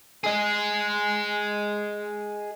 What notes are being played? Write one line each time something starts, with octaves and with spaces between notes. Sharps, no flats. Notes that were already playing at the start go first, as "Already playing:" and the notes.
G#4 D#5